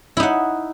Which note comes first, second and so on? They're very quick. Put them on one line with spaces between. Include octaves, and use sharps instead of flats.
E4 D#4 F#5